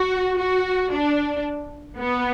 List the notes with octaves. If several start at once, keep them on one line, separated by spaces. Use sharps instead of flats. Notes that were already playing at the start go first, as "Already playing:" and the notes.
Already playing: F#4
F#4
D4
B3